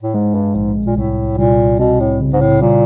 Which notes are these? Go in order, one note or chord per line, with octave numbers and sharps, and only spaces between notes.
A2
G#2 G#3
G2
A#1 G#2
A#2
C2 A2
C2 A#2
B2 C4
A2
C#3
G#2
A2
A#2 G3